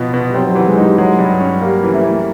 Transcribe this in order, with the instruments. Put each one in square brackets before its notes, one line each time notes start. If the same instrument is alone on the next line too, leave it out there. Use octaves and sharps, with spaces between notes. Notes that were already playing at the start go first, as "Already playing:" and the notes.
Already playing: [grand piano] B2 B3 [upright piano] F3
[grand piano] B2
[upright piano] G3
[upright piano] F#3 [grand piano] C4
[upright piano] F#3
G3
[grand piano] E3
[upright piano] G#3
[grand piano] D#4
[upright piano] G3
[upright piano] F#3 [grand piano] G#3
[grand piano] G2
C#4
[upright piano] G3 [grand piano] A#3
[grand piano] E3
[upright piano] A3
[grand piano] E3